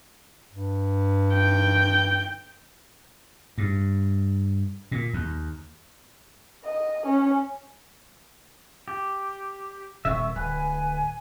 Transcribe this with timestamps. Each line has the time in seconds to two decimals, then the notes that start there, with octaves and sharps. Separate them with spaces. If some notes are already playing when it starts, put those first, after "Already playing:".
0.51 G2
1.34 G5
3.58 G2
4.91 A#2
5.13 D#2
6.64 D#5
7.06 C#4
8.88 G4
10.05 D#1 C3 E5 C#6
10.36 D1 B4 G#5